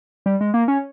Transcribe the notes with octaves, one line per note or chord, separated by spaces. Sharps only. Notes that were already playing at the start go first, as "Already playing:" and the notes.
G3
G#3
A#3
C#4